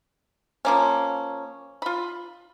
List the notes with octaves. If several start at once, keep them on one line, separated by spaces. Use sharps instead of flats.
F3 A#3 C#4
F4 B5